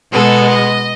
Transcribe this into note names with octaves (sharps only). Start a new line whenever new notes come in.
B2 G#3 B3 A4
D#5